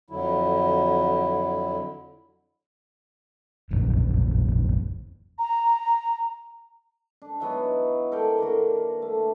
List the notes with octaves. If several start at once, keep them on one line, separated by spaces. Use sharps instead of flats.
F2 D3 F#3 E4
F1 A#1 F#2
A#5
D4
E3 F#3 B3 D#4
A4 A#4 D5 G5
D3 A#3 F#4
A3